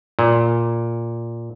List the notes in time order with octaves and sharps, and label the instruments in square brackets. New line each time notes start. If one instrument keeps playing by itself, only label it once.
[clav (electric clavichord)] A#2